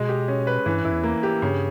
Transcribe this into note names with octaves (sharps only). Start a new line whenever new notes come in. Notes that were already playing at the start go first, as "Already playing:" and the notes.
Already playing: B2 G#3 D#5
G4
C#4
B4
G2 E3
G2 E4
E2
A#3
G4
G2 C#3